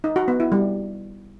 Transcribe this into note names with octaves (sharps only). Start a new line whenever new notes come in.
D#4
F#4
B3
E4
G3